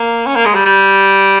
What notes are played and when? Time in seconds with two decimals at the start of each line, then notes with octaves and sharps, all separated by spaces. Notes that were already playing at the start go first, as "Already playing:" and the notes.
Already playing: A#3
0.26 C#4
0.35 A#3
0.45 G#3
0.55 G3
0.65 G3